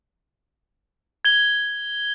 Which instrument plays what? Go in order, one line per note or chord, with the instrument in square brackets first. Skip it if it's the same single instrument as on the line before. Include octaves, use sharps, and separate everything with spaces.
[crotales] G#6 G7